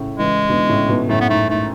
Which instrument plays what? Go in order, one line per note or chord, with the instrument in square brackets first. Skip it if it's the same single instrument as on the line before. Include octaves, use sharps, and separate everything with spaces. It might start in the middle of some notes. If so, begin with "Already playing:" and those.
Already playing: [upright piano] A2 C#3
[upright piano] C#3 E3 [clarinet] G#3
[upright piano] B2 D3
A2 C#3
G#2 B2
[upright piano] F#2 A2 [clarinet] A3
[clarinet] B3
[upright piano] G#2 [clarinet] A3
[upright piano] G#2 [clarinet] A3